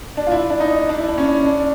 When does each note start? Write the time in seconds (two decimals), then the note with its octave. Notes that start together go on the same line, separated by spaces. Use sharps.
0.17 D4
0.27 F4
0.32 E4
0.50 D4
0.60 D#4
0.89 D4
0.98 E4
1.08 D4
1.18 C#4
1.46 D4